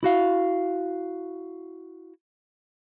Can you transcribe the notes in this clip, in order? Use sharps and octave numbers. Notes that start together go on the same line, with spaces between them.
E4 F#4 F5